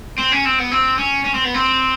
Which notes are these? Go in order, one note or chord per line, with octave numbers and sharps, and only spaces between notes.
C4
C#4
C4
B3
C4
C#4
C#4
C4
B3
C4